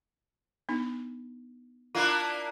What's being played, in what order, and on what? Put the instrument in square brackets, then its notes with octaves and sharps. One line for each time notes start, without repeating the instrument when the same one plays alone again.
[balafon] B3 D4 D#4
[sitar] A#3 D4 E4 [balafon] F4